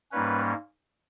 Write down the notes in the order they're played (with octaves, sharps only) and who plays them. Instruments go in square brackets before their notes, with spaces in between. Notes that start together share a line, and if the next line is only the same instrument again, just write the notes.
[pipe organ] G#2 G3 A#3 C#4 B4